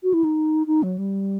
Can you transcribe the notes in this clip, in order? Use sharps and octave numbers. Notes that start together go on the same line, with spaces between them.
F#4
E4
D#4
D#4
F#3
G3